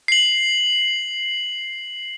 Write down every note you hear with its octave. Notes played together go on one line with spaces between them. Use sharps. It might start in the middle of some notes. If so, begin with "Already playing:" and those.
C7 F#7